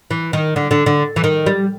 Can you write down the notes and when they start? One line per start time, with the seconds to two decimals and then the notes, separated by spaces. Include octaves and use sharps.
0.11 E3
0.33 D#3
0.56 D3
0.71 D3
0.86 D3
1.16 E3
1.24 D#3
1.46 G3